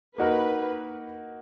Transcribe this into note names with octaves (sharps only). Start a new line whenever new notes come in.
A#3 D#4 F#4 A#4 B4